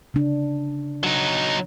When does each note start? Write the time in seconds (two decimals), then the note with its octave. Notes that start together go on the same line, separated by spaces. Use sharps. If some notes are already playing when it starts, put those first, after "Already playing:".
0.14 C#3 D4
1.03 F#3 D#4